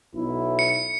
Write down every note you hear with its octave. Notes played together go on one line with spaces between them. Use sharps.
B1 E4
C#7